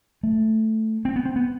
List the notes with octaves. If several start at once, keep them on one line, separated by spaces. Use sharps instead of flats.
A3
C4
B3
C4
B3